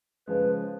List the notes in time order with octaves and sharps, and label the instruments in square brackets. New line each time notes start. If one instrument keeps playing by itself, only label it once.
[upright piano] C#3 F3 G#3 [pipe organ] B4